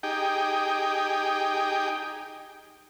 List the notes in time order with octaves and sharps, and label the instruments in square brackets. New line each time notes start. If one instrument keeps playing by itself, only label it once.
[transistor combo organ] D#4 G4 G#4 G5